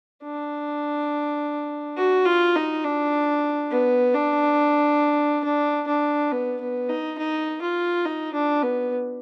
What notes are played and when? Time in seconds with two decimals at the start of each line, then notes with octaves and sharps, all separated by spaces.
0.23 D4
1.98 F#4
2.25 F4
2.56 D#4
2.85 D4
3.71 B3
4.14 D4
5.44 D4
5.88 D4
6.32 B3
6.61 B3
6.89 D#4
7.18 D#4
7.62 F4
8.06 D#4
8.34 D4
8.63 B3